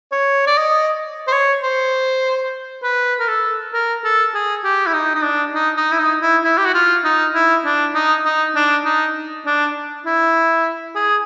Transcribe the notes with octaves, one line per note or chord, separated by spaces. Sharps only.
C#5
D5
D#5
C5
C#5
C5
B4
A#4
A4
A#4
A4
G#4
G4
E4
D#4
D#4
D4
D#4
D#4
E4
D#4
E4
E4
G4
F#4
F4
D#4
E4
D4
D#4
D#4
D4
D#4
D4
E4
G#4